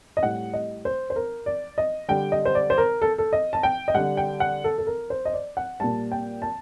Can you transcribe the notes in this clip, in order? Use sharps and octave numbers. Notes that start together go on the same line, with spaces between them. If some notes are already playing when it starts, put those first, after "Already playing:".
D#5
A2 G3 F#5
D#5
C5
C5
A#4
D5
D#5
D3 G3 G5
D#5
C5
D5
C5
A#4
A4
A4
D#5
A5
G5
D#5
D3 G3 F#5
G5
F#5
A4
A4
A#4
C5
D#5
D5
F#5
A#2 G3 A5
G5
A5